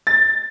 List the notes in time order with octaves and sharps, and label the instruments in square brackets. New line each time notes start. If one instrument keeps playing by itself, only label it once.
[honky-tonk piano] A6